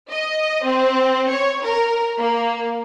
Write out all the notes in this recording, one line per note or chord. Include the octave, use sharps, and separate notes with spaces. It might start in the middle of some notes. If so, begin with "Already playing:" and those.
D#5
C4
C#5
A#4
A#3